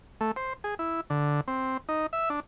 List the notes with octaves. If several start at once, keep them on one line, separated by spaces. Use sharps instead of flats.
A3
C5
G#4
E4
D3
C4
D#4
E5
D4